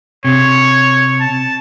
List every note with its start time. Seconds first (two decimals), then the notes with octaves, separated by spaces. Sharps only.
0.25 C3 C#5
1.20 A5